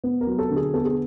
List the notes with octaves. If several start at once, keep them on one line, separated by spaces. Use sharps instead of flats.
B3
A#4
F#3
A4
D3
G#4
B3 A4
G#4